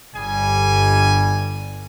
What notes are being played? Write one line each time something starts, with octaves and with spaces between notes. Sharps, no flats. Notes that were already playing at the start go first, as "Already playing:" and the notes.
G1 G3 G#5